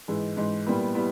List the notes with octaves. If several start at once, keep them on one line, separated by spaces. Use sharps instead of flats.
G#2 E3 G#3
G#2 E3 G#3
A#2 G3 B3 E4
G3 B3 E4